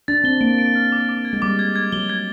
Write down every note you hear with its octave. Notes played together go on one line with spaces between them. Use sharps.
D4 A6
C4 G7
A#3 D7
D7
F6
D6
D6
G#6
G#3
G3 D6
G#6
G#6
F#3 G7
G#6